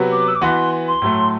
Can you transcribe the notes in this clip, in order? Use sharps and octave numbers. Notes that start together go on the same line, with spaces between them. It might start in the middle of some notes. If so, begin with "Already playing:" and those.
Already playing: C3 F#3 B3 F#4
D6
E6
D6
E3 B3 F#4 C6
C6
A2 F#3 A3